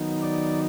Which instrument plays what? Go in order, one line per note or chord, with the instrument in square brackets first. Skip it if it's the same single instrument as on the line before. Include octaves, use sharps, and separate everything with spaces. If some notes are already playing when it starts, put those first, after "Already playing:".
Already playing: [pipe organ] D#3 F#3 B3 D#4
D5